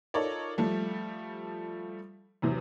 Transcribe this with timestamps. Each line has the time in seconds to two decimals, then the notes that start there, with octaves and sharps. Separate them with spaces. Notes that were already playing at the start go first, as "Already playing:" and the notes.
0.14 D#4 F4 A4 A#4 C#5 D5
0.58 F3 G3 A3
2.42 E2 C3 F#3